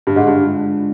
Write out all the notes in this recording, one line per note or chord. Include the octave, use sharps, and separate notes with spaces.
G2 D3
G#2
G2
G#3 D4 F4